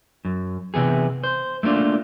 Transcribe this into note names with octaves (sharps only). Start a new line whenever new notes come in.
F#2
C3 E3 B3 G#4
C5
A3 A#3 D4 F4